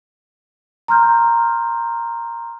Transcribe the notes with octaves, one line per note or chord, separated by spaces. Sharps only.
A#5 C6 F6 G6